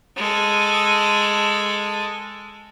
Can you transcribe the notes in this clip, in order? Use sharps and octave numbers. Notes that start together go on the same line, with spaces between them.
G#3 A4